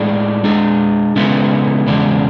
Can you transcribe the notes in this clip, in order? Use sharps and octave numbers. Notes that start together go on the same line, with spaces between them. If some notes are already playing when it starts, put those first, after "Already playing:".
Already playing: A2 G#3 D4 G#4 D5
G#3 D4 G#4
C#3 G#3 B3 E4 A4
E2 C#3 G#3 D4